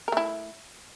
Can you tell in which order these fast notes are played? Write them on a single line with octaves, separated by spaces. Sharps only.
A#4 A3 E4